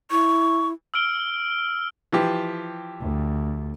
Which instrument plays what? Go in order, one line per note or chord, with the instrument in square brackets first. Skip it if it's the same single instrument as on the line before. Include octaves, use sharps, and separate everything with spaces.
[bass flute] E4 [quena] C#6
[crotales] E6 F6 D7 G7
[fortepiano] E3 F3 G4
[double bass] D2